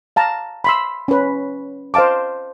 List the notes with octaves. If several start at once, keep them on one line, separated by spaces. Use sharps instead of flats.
F5 A5 A#5
B5 C6 E6
C#4 B4
C5 D#5 F5 A5 D6